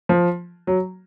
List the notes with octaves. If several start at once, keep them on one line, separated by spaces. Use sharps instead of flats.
F3
F#3